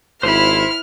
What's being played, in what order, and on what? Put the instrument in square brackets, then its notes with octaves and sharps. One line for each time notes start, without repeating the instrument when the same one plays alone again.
[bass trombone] G#1 [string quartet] E4 [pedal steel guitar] C5 B5 [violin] F6